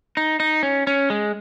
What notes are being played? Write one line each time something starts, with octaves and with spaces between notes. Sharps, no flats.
D#4
D#4
C#4
C#4
G#3